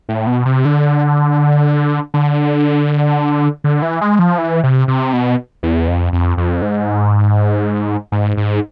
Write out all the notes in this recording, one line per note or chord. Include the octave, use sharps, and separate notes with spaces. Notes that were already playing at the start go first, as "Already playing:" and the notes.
A2
B2
C3
D3
D3
D3
E3
G#3
F3
E3
C3
C3
B2
E2
F2
F2
F2
G#2
G#2
G#2